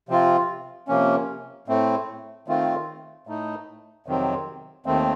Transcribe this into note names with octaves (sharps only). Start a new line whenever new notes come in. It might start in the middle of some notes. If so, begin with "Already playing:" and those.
C3 F3 C4 F4
C3 F3 A#3 C#4
A2 A3 C4
D#3 A3 C4 F4
A2 A3 D#4
F2 C3 D#3 F#3 C4
D#2 D#3 A3 C4